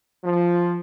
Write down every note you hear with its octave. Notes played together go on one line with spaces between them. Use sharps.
F3